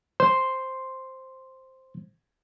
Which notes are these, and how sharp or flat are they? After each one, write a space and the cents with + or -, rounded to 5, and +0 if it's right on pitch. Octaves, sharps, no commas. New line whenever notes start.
C5 +0 C6 +0